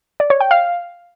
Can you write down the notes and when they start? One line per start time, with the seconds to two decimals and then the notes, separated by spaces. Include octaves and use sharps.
0.20 D5
0.30 C#5
0.40 G5
0.51 F5